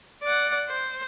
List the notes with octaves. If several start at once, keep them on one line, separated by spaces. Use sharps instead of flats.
D5 F#5
C5